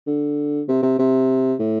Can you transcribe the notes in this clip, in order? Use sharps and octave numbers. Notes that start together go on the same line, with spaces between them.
D3
C3
C3
C3
A2